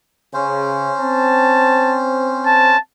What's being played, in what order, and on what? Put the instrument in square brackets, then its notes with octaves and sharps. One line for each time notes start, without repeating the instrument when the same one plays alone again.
[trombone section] C#3 [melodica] C#4 C5
[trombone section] C4 [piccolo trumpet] A5
[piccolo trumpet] A5